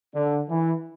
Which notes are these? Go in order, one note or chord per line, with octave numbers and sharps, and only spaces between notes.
D3
E3